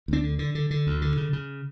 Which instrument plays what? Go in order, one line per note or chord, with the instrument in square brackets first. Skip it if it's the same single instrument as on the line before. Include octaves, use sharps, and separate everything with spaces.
[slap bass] D2 C4 D4
D3
D3
D3
D3
D2
D3
C#3
C#3